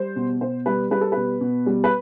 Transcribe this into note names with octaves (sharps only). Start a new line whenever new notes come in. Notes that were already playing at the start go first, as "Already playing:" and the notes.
Already playing: G3 C5
B2
B2 C5
G3 B4
G3 B4
A4
B2 B4
B2
G3
B4